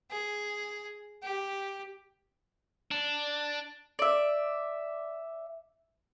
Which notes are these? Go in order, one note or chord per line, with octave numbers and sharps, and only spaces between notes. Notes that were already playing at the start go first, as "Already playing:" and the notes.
G#4
G4
D4
D5 E5